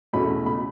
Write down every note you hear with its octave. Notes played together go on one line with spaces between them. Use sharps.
E2 B2 A3 C#4 B5
C#3 B5